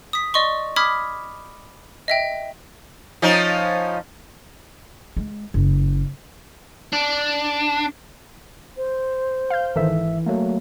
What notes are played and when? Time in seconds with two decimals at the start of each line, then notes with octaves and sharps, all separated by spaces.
0.13 D#6 B6
0.34 D5 D#5 C6 C#6
0.76 B5 D6 D#6 F6 G#6 B6
2.08 D#5 E5 G5
3.22 F3 C#4 D#4
5.17 G#3
5.54 F#1
6.93 D4
8.77 C5
9.50 F5 G6
9.76 G#1 D#3 E3 A4 E5
10.26 F#3 A3 A#3